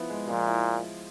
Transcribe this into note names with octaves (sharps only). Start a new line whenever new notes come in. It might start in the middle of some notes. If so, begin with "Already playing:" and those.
Already playing: F3 B3 E4
G#3
A#2 F3
E4